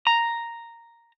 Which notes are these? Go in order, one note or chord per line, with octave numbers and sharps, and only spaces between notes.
A#5